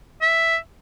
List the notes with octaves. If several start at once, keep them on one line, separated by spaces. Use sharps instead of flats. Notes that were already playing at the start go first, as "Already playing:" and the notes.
E5